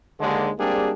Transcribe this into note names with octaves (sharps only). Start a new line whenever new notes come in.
D#2 D3 G#3
G3 G#3 A#3 C4 D4 G#4